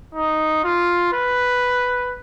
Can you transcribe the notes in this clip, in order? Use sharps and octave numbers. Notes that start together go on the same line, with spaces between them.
D#4
F4
B4